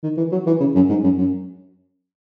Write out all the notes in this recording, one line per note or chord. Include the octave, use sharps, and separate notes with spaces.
D#3
E3
F#3
E3
C#3
F#2
G#2
F#2
F#2